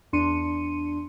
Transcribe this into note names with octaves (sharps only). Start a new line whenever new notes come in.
E2 D4 C6 C#7 D#7